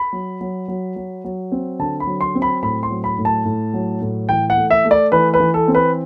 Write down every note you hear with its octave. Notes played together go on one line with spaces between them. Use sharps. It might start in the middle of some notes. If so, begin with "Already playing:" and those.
Already playing: B5
F#3
F#3
F#3
F#3
F#3
C4
D3 A5
B5
F#3
C6
C4
B5
A2 B5
C6
F#3
B5
A2
A5
A2
F#3
A2
E3 G5
F#5
A3
E5
A3
D5
E3 B4
B4
E3
A4
C4
B4